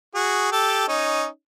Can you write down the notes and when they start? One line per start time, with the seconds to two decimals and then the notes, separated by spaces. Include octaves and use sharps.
0.14 F#4 G#4
0.51 G4 A4
0.88 C#4 D#4